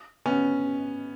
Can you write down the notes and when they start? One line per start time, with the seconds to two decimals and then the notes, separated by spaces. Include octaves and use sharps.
0.26 B3 C#4